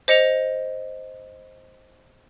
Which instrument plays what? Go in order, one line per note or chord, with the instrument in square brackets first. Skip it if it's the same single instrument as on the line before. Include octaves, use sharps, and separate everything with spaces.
[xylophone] C5 D#5 C#7 F7